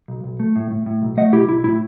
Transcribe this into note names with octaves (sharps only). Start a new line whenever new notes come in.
B1
B1
A3
A2
A2
A2
B1
A3 D#5 F#5
B1 E4 G4
B1 E4
A2 E4